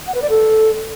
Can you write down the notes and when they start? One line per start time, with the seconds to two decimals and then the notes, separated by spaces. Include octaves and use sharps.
0.07 F#5
0.14 B4
0.22 D5
0.29 A4